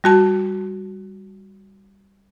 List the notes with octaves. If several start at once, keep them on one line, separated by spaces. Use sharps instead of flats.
G3 F#4 A5